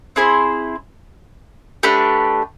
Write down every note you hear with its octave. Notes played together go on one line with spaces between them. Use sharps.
C4 E4 G#4 C5
A3 D4 G4 B4